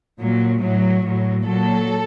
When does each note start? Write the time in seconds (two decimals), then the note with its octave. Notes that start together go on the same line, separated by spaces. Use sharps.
0.19 A#2 F#3
0.61 A2 F#3
1.03 A2 F#3
1.45 A#2 F#3 A4